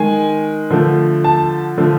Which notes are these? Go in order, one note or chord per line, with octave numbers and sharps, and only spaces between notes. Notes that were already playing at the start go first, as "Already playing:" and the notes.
Already playing: D#3 G#3 G#5
D3 F3 A3
A5
D3 F3 A3